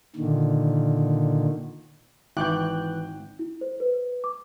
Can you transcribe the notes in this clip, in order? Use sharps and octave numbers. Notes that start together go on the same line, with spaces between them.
A#2 D3 D#3
G#1 E3 E4 G5 D6 F#6 G6
E4
C5
B4
D6